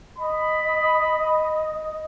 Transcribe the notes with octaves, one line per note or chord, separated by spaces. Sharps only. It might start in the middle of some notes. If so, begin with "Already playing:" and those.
D#5 B5